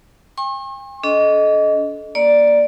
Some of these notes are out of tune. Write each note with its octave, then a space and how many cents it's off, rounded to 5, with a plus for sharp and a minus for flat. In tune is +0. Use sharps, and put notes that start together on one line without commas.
G5 +45 C#6 -45
D4 -40 A4 -30 D#5 +0
A#3 +10 D5 +0